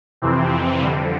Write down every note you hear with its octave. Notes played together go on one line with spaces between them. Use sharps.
F2 C3 E3 C4
F2 D3 G3